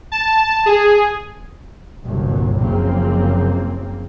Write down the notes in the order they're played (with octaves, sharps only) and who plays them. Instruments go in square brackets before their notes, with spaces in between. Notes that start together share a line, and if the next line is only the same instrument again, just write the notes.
[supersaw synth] A5
G#4
[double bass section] G1 C2 G2 A#2 F#3
F#1 C#3 F3 A#3 C4